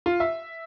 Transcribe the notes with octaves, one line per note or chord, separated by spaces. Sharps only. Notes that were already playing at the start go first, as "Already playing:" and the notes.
F4
E5